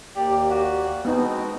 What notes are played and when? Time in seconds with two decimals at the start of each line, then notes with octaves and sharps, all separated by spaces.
0.16 D#2 A#3 G4 D5
0.50 F#4
1.05 B2 G#3 B3 C4 D#4 F#4